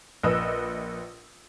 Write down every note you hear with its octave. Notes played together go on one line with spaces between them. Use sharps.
A#1 B4 D#5 D#6 E6